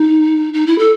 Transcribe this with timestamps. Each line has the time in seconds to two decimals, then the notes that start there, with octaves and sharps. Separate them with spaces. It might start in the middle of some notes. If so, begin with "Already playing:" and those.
Already playing: D#4
0.53 D#4
0.66 E4
0.78 A4